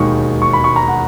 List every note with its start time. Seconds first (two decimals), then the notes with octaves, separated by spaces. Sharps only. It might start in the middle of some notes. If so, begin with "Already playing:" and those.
Already playing: E1 D#2 D#3 G#3 C#6
0.42 C#6
0.53 B5
0.64 C#6
0.76 A#5
0.88 F#5